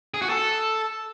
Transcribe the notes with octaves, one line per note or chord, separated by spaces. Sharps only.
G#4
F#4
A4